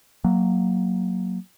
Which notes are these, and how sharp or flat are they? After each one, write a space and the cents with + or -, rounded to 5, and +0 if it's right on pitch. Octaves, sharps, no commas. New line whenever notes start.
F#3 +0 A#3 +0